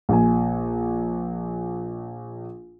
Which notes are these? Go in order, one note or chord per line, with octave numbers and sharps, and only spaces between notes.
A#1 G#5